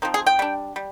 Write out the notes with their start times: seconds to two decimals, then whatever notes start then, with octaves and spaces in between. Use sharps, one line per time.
0.02 F3 C4 D#4
0.14 G#4
0.27 G5
0.39 G3 D4
0.76 G3